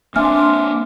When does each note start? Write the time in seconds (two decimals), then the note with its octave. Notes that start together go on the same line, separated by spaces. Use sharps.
0.16 A#3 C4 D4 E5 G#5 C6 D6 F6